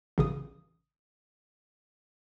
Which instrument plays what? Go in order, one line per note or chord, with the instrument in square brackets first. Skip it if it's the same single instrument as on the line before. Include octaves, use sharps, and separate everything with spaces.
[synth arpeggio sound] A1 C#3 D#6